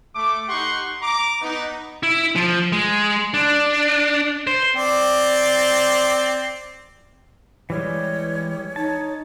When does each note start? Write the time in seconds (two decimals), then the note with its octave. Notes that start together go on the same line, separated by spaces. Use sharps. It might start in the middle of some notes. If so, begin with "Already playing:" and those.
0.15 A3 D6
0.48 D#4 G4 F#5 C6 C#6
1.02 A#5 D6
1.41 B3 D#4
2.03 E4
2.35 F3
2.72 G#3
3.34 D4
4.47 C5
4.76 C4 D5
7.70 E3 G3 G#3 C#5
8.76 D#4 C#5 A5